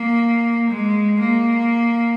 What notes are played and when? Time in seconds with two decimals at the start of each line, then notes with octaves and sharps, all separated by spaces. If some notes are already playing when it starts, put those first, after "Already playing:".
Already playing: A#3
0.70 G#3
1.20 A#3